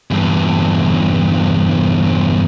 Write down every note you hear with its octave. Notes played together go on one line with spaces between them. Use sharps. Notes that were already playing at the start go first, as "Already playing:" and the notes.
E2 G2